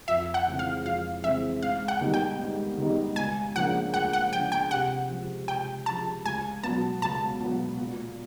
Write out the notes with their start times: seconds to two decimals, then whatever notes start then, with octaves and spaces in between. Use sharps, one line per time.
0.08 F2 E5
0.34 F#5
0.47 C#3 E3 G#3 C4
0.59 F5
0.85 F2 F5
1.24 C#3 E3 G#3 C4 E5
1.63 G#2 F5
1.88 F#5
2.01 D#3 G3 B3 D#4
2.14 G5
2.39 G#2
2.78 D#3 G3 B3 D#4
3.16 C#2 G#5
3.55 C#3 F3 A#3 D4 F#5
3.94 C#2 F#5
4.13 F#5
4.32 C#3 F3 A#3 D4 G5
4.52 G5
4.71 C3 F#5
5.09 F3 G#3
5.48 C3 G5
5.86 F3 G#3 A5
6.25 C#2 G#5
6.63 B2 F#3 B3 A5
7.02 C#2 A5
7.40 B2 F#3 B3
7.79 A#2